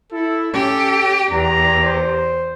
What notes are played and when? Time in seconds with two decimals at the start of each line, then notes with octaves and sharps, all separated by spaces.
0.12 E4 A4
0.54 C#4 G4 A4
1.32 E2 G4 A#5
1.85 C5